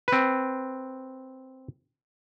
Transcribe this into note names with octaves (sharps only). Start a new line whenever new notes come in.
C4 B4